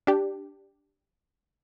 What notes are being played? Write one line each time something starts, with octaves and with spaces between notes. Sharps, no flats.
D4 G4